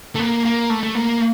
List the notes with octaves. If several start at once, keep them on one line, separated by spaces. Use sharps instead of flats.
A3
A#3
A#3
A3
A3
A#3